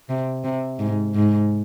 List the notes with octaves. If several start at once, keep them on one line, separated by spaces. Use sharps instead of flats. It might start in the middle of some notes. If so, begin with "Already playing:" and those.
C3
C3
G#2
G#2